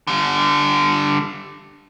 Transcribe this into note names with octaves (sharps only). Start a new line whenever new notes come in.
D3 G3